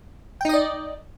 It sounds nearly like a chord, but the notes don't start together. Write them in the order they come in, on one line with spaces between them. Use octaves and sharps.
G5 D#4 D#5 D5